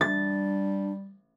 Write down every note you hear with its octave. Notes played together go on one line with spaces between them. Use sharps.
G3 D4 A6